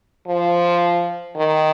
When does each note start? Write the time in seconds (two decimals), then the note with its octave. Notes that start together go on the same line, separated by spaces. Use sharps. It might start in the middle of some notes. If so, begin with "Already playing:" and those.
0.27 F3
1.36 D#3